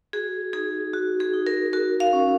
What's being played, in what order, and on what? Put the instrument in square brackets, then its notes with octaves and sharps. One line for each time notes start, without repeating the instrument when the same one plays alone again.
[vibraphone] F#4 G#4
D#4 G#4
F#4
G#4
D#4
A#4
F#4 A#4
F5
C#4